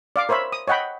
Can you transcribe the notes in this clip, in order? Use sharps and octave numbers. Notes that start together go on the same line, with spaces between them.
D5 F5 D6
A#4 C5 C#5 E5 B5
D#6
C#5 D#5 F#5 G5 B5